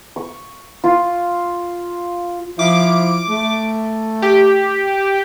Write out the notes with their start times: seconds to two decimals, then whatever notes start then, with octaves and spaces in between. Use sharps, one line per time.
0.16 C#6
0.84 F4
2.59 F3 E4 D6
3.30 A3
4.22 G4